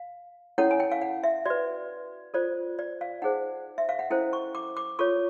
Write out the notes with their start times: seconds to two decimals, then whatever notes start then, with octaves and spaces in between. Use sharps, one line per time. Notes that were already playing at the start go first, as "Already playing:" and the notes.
Already playing: F5
0.58 C#4 E4 A4 C#5 F#5
0.71 G#5
0.80 G5
0.92 F5
1.02 F#5
1.24 E5
1.46 F#4 B4 D5
2.34 F4 A4 C5 D5
2.79 D5
3.01 F5
3.22 D#4 G#4 C5 F#5
3.78 E5
3.89 F5
3.99 F#5
4.10 C#4 E4 A4 C5 G5
4.33 C#6
4.55 D6
4.77 D6
4.99 F4 A4 C#5 C#6